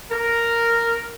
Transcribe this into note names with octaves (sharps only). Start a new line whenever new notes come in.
A#4